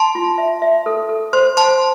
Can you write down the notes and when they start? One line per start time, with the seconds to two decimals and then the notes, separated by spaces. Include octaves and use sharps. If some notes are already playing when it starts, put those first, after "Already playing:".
Already playing: A5 C6
0.15 F4
0.38 E5
0.62 E5
0.86 A4
1.09 A4
1.33 C5 C6
1.57 C5 A5 C6